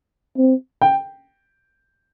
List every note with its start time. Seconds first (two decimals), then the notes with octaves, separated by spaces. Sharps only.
0.38 C4
0.82 G5